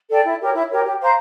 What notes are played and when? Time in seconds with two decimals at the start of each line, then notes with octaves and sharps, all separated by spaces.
0.09 A4 D5 G5
0.24 E4
0.39 G4 A#4 C#5
0.53 E4
0.70 G4 A#4 C#5
0.84 G4
1.00 C5 F5 A#5